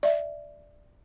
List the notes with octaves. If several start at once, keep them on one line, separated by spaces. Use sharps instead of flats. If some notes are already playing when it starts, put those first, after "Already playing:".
D5 E5